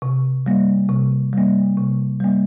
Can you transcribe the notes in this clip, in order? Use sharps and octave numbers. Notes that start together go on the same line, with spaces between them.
C3
G3 A#3
C3
G3 A#3
C3
G3 A#3